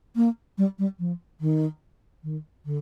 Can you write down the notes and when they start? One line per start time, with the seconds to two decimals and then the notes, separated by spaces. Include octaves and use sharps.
0.16 A#3
0.58 G3
0.79 G3
0.99 F3
1.40 D#3
2.23 D#3
2.65 D3